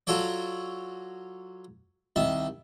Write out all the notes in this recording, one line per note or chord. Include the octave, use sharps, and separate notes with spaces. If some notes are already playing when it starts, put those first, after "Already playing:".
F#3 F4 F#4 A4 C#5 D5
C2 D#3 E5 A5